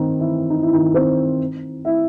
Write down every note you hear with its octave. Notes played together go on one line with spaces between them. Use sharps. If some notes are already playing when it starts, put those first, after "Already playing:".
Already playing: D#3 C4 D#4
E3 E4
D#4
E4
D#3 D#4
C4 C5
E4 E5